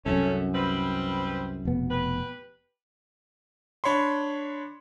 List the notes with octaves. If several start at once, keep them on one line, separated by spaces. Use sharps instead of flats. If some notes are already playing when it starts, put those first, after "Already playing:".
C2 F#2 A3 C#4
G3 C4 B4
F1 B2 B3
G4 B4
D4 C#5 B5 C6